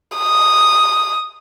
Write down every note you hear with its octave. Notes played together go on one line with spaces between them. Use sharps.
D#6